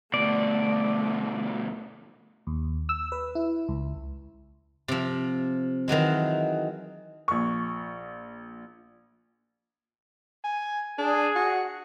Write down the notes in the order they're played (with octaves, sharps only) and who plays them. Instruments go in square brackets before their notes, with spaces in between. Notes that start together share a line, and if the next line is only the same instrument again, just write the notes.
[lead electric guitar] D2 B2 [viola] A3 [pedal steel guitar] D5
[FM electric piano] D#2
E6
B4
E4
C#2
[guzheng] C3 F3
D#3 E3 F#3 G#3
[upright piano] A#1 C#6
[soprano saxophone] G#5
[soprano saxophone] D4 [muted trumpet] G#4
[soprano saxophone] F#4